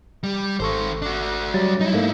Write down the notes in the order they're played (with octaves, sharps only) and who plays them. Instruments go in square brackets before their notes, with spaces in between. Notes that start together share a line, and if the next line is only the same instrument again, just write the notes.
[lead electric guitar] G3
[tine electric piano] G#1 A4 C#6 [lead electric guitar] D#3 C5
[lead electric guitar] D4 F#4
[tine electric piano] F#3 G3 A6
[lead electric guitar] D#4 E4
[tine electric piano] G#2 A3 A#3